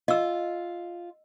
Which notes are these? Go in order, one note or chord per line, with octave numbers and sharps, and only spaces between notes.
F4 D#5 E6